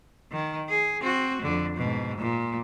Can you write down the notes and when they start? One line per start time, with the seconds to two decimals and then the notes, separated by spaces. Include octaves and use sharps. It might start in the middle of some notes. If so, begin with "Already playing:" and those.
0.32 D#3
0.69 G#4
1.03 C4 F#4
1.43 F2 D3
1.77 G#2 B2
2.19 A#2